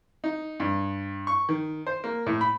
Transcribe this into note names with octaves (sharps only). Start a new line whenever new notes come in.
D#4
G2
C#6
D#3
C5
A#3
A2
B5